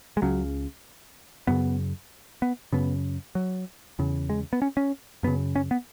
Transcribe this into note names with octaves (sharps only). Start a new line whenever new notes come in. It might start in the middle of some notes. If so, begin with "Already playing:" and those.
G#3
C#2 C#3 F#3
F#2 C#3 B3
B3
F#2 C#3 B3
F#3
E2 C#3
G#3
B3
C#4
C#4
F#2 C#3 B3
C#4
B3